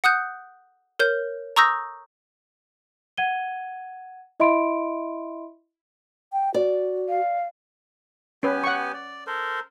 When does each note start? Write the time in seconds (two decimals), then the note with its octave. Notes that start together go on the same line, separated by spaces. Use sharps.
0.04 F#5 D#6 F#6 G6
0.99 A#4 C#5 G6
1.56 A#5 C#6 D#6 E6 G6 A#6
3.17 F#5 G#6 D#7 G7
4.40 E4 D#5 E5 B5 C6 D7
6.33 G5
6.54 F#4 D5
7.09 F5
8.43 B3 C#4 G4 B4 G#5
8.64 F#5 C#6
8.94 D5
9.27 A4 A#4 C5